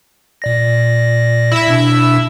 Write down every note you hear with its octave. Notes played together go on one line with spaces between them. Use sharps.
A#2 D5 A#6
E4 E5
B2 D4